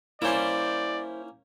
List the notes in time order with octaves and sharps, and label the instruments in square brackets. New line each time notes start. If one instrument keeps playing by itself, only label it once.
[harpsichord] A#3 C#4 [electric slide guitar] E4 C5 [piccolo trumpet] D5